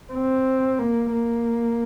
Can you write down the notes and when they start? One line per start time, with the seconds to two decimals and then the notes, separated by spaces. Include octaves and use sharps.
0.13 C4
0.79 A#3
1.12 A#3